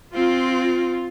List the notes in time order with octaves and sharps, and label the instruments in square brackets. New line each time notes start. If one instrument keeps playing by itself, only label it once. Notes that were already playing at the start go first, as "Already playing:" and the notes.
[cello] C4 [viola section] F4